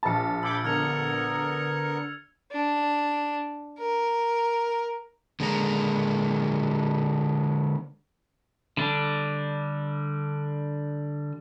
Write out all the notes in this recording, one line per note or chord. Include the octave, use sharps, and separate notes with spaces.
A#1 A5 A6 C#7
B5 D6 E6 G6 G#6 C#7
D3 B3 A#4 F6 G#6 C#7 F7
D4
A#4
D3 G#3 A#3 E4 A#5
D3 G3 D4